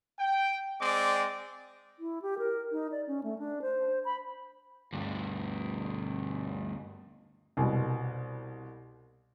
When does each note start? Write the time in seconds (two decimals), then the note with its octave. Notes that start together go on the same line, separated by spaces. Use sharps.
0.19 G5
0.80 G#3 C4 D5 D6
1.99 E4
2.22 G4
2.38 A#4
2.72 D#4
2.92 D5
3.07 C#4
3.23 A3
3.38 D4
3.62 C5
4.05 B5
4.93 D2 G2
7.57 C2 B2